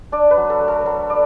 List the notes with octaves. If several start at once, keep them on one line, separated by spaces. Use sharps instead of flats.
D4 D5
B4
F#3
A4
A3
A4
F#3 A4
D4 D5